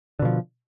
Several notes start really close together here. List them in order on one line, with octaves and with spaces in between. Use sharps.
D3 B2 F3